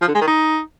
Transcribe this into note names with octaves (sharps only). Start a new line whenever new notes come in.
F3
D3
G#3
D#3
D#4